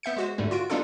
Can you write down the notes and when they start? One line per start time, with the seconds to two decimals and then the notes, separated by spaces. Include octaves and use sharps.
0.03 B3 E5 G6 C#7
0.16 G#3 F#4 C5
0.38 G#2 D3 G3 A3
0.51 F4 F#4 D7
0.70 G3 B3 D4 D#4 F4 A4